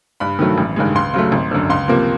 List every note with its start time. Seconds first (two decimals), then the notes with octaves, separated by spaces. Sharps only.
0.20 G2 B5
0.39 D#3 F#3 A3
0.58 A1
0.76 G2 D#3 G#3
0.95 C#2 C6
1.14 C#3 F#3 A3
1.32 G#1
1.51 F#2 D3
1.69 C#2 C6
1.88 C3 F3 A#3